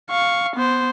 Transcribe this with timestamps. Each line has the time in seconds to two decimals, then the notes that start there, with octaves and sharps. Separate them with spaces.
0.11 F5 C#6
0.56 B3 C5